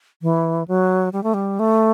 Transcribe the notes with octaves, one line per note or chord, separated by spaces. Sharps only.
E3
F#3
G3
A3
G3
A3